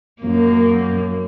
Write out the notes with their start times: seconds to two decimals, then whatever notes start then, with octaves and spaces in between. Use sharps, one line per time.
0.22 F#2 A#3